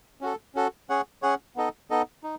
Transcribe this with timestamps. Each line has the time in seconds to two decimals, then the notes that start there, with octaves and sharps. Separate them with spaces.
0.21 C#4 F#4 A4
0.55 C#4 F#4 A4
0.89 C#4 G#4 C#5 F#5
1.22 C#4 G#4 C#5 F#5
1.56 B3 D#4 A4 D#5
1.90 B3 D#4 A4 D#5
2.24 D#4